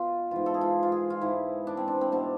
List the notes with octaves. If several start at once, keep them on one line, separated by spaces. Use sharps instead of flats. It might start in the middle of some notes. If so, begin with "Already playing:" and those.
Already playing: B2 F4
G#2 E3 F4
A4
G#4
F4
F4
G#4
F4
G#2 E3 E4
D4
C4
D4
C4
B2 D4